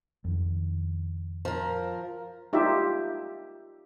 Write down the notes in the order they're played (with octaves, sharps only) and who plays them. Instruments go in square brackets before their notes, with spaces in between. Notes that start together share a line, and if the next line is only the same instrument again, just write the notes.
[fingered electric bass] F2 D#3
[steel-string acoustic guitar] F3 A#4
[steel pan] D#4 F4 G4 E5